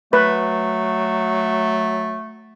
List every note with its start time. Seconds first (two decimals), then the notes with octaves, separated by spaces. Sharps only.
0.13 F#3 A3 B4